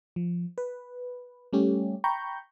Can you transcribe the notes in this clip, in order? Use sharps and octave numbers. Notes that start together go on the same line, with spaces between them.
F3
B4
G3 A3 C#4 G4
G5 A#5 B5 C#6 G6